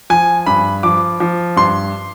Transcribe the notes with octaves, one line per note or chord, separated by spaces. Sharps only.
F3 G#5
G2 B5
F3 D6
F3
G2 C6